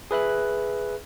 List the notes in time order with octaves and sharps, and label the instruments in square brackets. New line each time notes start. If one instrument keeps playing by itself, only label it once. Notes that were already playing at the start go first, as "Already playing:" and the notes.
[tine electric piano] G#4 B4 E5 F#6